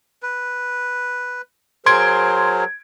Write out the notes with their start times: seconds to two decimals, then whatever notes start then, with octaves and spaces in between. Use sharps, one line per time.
0.22 B4
1.86 F#3 G#4 A#4 C5 C6 G#6 D7